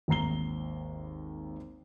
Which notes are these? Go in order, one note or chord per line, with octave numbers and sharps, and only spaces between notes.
G#1 D#2 A#5 C7 G7